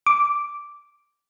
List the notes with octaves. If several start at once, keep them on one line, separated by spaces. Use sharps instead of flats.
D6